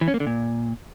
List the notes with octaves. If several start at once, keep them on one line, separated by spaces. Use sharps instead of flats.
E3
C#4
A#3
D3
A#2